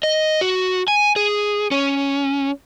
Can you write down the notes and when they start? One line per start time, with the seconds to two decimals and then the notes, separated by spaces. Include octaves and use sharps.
0.03 D#5
0.41 F#4
0.88 G#5
1.16 G#4
1.71 C#4